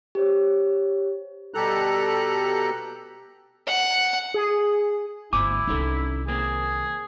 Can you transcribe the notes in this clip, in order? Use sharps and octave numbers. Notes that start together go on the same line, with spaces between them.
G4 C5 C#5
B2 G3 G4 A4 A#5 F#6
F#5
G#4
G1 D2 E4 C5 G#5 D6
C2 D#3 C#4 D#4 A4
D#2 A#3 C4 G#4